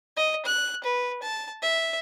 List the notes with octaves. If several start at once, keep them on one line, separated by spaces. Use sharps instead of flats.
D#5
F#6
B4
A5
E5